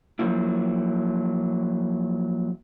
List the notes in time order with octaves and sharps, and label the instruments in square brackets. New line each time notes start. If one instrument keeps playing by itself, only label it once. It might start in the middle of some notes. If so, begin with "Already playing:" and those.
[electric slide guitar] F3 F#3 A#3 E4